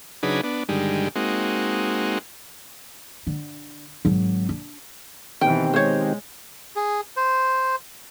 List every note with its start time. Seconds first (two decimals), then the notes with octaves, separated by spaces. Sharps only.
0.23 C#3 F#3 D4 D#4 G#4 B4
0.44 B3 D4
0.69 G2 D3 D#3 G3 G#3
1.15 G#3 A#3 C4 D#4 F#4
3.27 D3
4.05 G#1 F#3
4.49 D4
5.41 B2 D#3 E3 C4 G4 G5
5.74 G#3 C5 C#5
6.76 G#4
7.17 C5